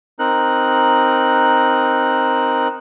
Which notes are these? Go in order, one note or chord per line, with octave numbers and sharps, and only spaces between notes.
C4 D#4 A#4 F#6